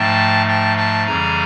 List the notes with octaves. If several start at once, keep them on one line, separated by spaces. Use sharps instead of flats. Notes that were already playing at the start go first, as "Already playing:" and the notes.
Already playing: G#2 F3 A3 G5 A5
G5 A5
G5 A5
F2 C#3 E3 G3 G#5 A#5